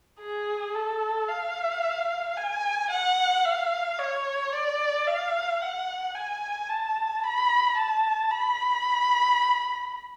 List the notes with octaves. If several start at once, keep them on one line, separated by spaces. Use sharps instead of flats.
G#4
A4
F5
G#5
F#5
F5
C#5
D5
F5
F#5
G#5
A5
B5
A5
B5